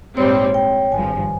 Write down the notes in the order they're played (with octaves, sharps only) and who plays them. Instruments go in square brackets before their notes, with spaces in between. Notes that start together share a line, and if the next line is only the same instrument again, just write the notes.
[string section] A#1 G#2 G3 C4 [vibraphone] C#5
[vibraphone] G5
[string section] G#1 G2 F3 [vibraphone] G#5